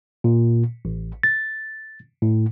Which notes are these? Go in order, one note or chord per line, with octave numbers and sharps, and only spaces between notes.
A#2
A1
A6
A2